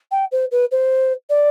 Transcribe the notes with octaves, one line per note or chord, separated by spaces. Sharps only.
G5
C5
B4
C5
D5